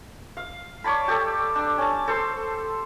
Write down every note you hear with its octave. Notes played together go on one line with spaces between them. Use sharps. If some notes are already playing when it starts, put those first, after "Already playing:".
F5
C#5 D5 A5 B5
G4 A4 D5
D4
C#4 A5
A4 C5 C6 E6